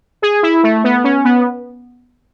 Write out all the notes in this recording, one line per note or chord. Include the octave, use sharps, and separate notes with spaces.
G#4
E4
A3
B3
C#4
B3